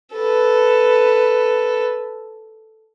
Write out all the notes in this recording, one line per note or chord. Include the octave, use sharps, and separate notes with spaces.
A4 B4